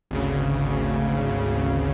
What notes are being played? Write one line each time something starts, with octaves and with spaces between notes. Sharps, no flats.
G#1 D2 C#3